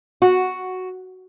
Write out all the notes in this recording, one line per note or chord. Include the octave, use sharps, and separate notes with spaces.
F#4